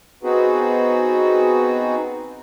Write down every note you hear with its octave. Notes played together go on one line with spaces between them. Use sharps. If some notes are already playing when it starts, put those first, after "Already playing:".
B3 C4 D#4 F#4 G#4 B4